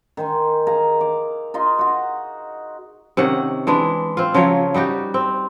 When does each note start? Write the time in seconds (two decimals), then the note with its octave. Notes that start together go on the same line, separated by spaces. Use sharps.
0.17 D#3 C5 G#5
0.67 G#4 F5 A#5
1.01 D6
1.54 D#4 F4 D#5 C6
1.79 F#4 F#5
3.17 C3 D#3 C#4 F#5
3.67 E3 G#3 D4
4.17 C4 F4
4.34 C#3 F3 F#3 C#5
4.74 G3 D#4 F#4 G4
5.14 C4